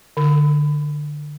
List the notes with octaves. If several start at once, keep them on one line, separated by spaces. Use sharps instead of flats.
D3